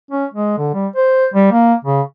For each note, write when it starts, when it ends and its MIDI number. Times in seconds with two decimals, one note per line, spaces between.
0.11 0.25 61
0.34 0.57 56
0.58 0.73 50
0.74 0.87 55
0.96 1.27 72
1.34 1.47 55
1.52 1.74 58
1.84 2.01 49